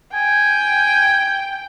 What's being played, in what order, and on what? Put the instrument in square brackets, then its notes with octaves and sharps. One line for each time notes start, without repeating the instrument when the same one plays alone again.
[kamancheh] G5 [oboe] G#5